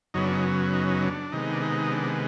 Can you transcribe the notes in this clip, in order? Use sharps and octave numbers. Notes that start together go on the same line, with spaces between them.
F#2 C#3 F#3 B3 D#4
D4
D#4
D#4
D#4
D4
C3 D#3 G#3 B3 D#4
D4
D#4
D4